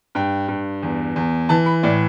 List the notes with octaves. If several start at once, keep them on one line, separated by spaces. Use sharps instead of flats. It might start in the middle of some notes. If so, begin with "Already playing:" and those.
G2 G5
G2
E2
E2
E3 A5
B5
A2 D5